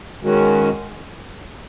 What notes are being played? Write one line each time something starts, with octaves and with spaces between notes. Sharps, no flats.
D#3 G#3 C#4 F#4